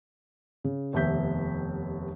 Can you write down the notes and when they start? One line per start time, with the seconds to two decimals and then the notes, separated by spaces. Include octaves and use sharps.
0.64 C#3
0.93 F1 D#2 B3 E5 G6 B6